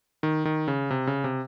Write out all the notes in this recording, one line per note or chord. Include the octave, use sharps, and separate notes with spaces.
D#3
D#3
C#3
C3
C#3
C3